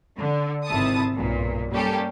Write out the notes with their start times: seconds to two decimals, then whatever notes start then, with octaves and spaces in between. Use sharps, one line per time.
0.16 D3
0.66 G#1 C3 E4 A5 D#6
1.16 B1 G2 A#2
1.71 G3 A#3 C#4 G4 A4